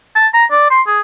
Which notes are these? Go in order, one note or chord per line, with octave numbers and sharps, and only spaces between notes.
A5
A#5
D5
C6
G#4